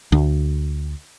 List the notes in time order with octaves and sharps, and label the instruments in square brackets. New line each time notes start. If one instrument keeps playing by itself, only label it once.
[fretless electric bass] D2